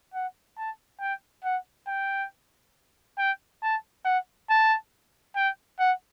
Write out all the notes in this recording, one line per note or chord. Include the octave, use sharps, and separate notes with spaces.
F#5
A5
G5
F#5
G5
G5
A5
F#5
A5
G5
F#5